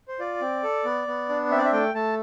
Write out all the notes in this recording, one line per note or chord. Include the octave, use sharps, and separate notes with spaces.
C5
F4 D5
C4
A4
B3
B3
D4
C4 E5
D5
E5
A3 G5
A3 A5